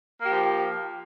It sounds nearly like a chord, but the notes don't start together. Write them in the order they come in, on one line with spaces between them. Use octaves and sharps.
A#3 G4 F3